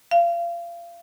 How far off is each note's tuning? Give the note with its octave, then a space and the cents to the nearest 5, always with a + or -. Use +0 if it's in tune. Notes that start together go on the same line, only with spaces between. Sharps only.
F5 -30